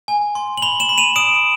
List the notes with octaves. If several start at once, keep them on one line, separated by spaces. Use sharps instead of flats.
G#5
C6
F#7
B5 F7 G7
E7 F#7
B5
D#7 F7
D#6 D7 E7